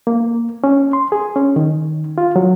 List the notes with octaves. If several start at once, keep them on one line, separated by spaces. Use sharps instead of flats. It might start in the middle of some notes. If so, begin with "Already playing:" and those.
A#3
C#4
C6
G#4
C#4
D#3
F4
F#3